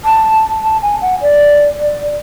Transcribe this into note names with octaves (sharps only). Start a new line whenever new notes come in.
A5
A5
G#5
F#5
D5
D5